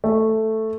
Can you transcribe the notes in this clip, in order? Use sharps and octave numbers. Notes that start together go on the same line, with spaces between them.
A3